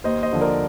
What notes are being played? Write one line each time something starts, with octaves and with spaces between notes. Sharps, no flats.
D#2 C5 D#5
C5 D#5
D3 F3
A#4 D5